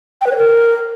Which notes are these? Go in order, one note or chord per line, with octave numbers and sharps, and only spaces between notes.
G5
B4
C#5
A#4